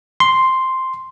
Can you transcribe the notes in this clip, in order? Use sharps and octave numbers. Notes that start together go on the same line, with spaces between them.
C6